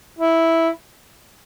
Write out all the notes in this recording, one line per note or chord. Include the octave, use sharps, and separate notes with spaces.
E4